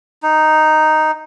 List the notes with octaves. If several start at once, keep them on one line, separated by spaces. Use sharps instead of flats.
D#4